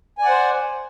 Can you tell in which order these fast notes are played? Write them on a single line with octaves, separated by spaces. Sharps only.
G#5 D5 F#5 C5